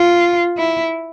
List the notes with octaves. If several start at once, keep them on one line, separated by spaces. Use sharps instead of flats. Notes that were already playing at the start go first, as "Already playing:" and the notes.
Already playing: F4
E4